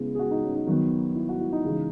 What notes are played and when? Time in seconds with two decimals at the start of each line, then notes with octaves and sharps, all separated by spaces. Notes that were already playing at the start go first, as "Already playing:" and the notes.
Already playing: C#3 G#3 B3 E4
0.15 G#4
0.19 F#4
0.31 D#4
0.43 C#4
0.55 D#4
0.67 D#3 F#3 B3
1.16 E4
1.29 F#4
1.41 E4
1.52 D#4
1.65 C#3 E3 G#3